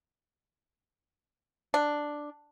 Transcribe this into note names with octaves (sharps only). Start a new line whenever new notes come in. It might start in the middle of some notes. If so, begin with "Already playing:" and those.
D4